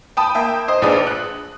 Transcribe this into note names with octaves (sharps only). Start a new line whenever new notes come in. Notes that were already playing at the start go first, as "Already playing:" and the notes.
G5 A5 B5 D#6
A#3 E5 G5
C5 D#5 D#6
A#1 D4 G#4 B4 D5 D#6
F#6